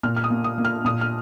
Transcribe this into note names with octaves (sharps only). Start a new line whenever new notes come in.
A#2 F6
F6
D#6
A#3
D#6
A#3
F6
A#2 D#6
F6